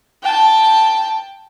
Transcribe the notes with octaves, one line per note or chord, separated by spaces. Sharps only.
G5 A5